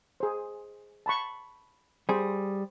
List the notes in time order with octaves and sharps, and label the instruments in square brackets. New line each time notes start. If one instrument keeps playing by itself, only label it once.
[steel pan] G#4 C5
A5 B5 C#6
[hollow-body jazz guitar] G3 G#4 [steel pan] C5